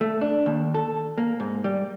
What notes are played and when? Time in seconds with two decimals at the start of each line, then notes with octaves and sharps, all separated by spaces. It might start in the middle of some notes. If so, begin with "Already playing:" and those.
0.01 A3
0.21 D4
0.46 D#2
0.74 A4
1.18 A#3
1.40 G#2
1.64 G3